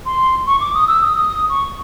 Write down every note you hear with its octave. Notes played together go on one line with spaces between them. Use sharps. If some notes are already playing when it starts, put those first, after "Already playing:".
C6
C#6
D6
D#6
E6
D#6
D#6
D#6
C#6